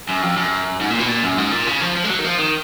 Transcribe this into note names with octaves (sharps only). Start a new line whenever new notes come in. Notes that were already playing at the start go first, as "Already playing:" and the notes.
F#2
F2
F#2
G#2
A#2
B2
A#2
F#2
G#2
A#2
C#3
F3
F3
G#3
F#3
D#3
F3
D#3